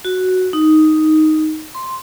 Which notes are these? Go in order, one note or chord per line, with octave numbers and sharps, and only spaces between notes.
F#4
D#4
C6